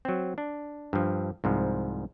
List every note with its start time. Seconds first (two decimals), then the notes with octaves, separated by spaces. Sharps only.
0.05 F#3 C4
0.38 D4
0.93 G2 F3
1.44 C2 G#2 F3